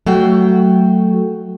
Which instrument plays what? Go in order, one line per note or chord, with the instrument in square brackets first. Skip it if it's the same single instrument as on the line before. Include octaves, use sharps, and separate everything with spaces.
[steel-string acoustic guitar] F#3 A3 F#4 G5